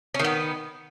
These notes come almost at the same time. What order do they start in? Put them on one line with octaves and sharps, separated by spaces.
C#4 D#3 B3